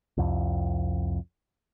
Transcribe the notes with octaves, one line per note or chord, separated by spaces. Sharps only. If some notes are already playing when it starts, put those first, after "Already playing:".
C2 F2